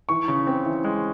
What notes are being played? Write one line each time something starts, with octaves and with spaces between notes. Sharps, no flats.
E3 C#6
C#3
C4
E3
G#3